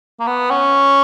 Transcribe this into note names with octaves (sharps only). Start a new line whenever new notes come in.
A#3
B3
C#4